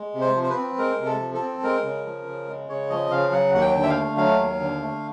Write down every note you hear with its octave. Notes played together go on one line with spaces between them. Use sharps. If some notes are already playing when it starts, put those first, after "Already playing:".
Already playing: G#3
C3
C5
F3
C5
B4
C4
G#3 A#4
C3
A4
F3
A4
C4
G#3 A#4
C#3
F3
C#3
G#3
C#3 C#5
F3 D#5
C#3 F5
F#3 F#5
D#2 F#5
G5
D3
E5
F5
A3
F#3 F5
D#2
D3
A3